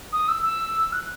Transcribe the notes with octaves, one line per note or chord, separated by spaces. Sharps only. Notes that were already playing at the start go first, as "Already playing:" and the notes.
D#6
E6
E6
F#6